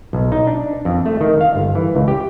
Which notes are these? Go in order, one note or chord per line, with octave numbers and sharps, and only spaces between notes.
B1
D#4
D4
F2
A3
D#3
F5
G1
E3
C#2
G4